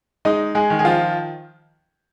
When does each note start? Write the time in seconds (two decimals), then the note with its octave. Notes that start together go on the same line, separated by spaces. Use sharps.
0.25 G#3 D#4 D#5
0.55 G#3 G#4
0.70 D#3
0.79 G#4
0.85 F3 F4